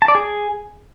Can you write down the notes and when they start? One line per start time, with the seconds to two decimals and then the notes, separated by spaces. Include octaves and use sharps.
0.02 A5
0.08 D5
0.15 G#4